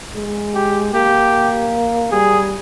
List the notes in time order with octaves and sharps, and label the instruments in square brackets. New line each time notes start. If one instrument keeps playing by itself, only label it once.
[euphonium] G#3
[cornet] G4
[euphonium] A#3 [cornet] G4
[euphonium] G3 [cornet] G#4